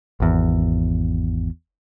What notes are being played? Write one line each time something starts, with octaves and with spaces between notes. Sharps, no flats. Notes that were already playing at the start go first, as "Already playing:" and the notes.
G#1 E2